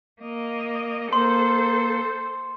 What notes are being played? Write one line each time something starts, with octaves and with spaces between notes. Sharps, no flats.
A#3 D#5
A#3 A4 C5 C6